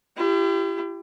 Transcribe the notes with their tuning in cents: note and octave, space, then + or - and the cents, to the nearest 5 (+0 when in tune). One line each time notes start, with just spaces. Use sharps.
E4 +45 G4 +0